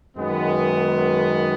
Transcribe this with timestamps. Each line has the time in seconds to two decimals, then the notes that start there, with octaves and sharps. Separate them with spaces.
0.17 F#2 D#3 G#3 B3